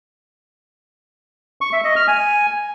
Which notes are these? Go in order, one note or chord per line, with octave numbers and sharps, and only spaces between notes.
C#6
E5
D#5
F6
G#5